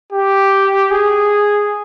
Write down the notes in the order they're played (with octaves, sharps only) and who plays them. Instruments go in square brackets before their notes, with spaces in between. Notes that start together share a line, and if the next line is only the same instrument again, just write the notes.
[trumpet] G4
G#4